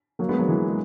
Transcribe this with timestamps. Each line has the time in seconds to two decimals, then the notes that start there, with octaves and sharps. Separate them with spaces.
0.19 F#3 A#3
0.29 G#3 B3
0.38 F#3 A#3
0.48 E3 G#3
0.69 G#3